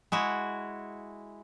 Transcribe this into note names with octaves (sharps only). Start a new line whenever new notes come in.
G#3 E4 F#4